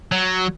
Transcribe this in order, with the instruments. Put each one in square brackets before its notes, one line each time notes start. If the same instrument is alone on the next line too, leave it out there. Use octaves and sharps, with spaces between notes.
[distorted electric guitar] F#3